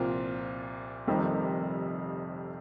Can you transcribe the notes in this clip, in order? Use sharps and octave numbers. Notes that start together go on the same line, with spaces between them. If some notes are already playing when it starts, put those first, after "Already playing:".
Already playing: C2 A#2 F3 C4 F4
F1 F2 C3 D#3 G3